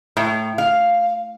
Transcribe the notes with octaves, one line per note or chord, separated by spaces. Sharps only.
A2
F5